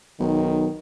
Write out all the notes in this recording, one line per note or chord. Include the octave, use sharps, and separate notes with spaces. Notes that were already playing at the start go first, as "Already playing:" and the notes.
B1 D#3